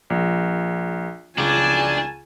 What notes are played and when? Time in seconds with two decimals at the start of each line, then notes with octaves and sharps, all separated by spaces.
0.10 A#1
1.38 C#2 D4 G#5 A5